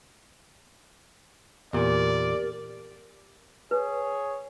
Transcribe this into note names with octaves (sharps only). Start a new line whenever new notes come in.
E2 A#2 G4 A#4 D5
G#4 B4 C#5